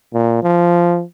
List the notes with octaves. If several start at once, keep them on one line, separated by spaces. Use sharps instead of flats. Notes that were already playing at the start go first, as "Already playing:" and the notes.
A#2
F3